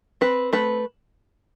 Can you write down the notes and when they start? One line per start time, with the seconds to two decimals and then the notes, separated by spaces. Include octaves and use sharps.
0.21 C4 B4
0.53 A3 B4